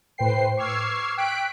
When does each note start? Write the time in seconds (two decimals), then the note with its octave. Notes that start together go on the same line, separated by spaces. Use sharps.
0.18 A2 B4 C5 G5 C7
0.57 C#6 D6 E6 F6 G#6 C7
1.17 G5 F#6 B6 D7